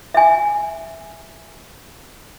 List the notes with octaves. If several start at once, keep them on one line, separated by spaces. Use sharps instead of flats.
E5 G#5